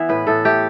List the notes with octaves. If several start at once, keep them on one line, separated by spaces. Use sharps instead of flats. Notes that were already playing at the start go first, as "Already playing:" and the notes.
Already playing: E3 B3 E5
A2 B4
A2 A4
A3 G4